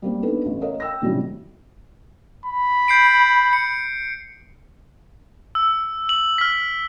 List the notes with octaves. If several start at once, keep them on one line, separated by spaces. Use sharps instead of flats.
G3 A#3 C4
B3 D4 D#4 A4 B4
A1
A#4 C#5 D#5 F5
G5 E6 A#6
A2 C3 D#3 F#3 G3 C#4
B5
G6 C7 D7
C#7
E6
F#7
F6 B6